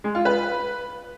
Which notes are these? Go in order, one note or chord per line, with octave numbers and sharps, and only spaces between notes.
G#3
F4
B4